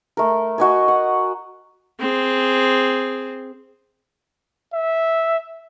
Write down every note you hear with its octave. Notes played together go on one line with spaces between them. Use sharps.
A3 A#4
F#4 D#5 G#5
F#5
C4 G#4
E5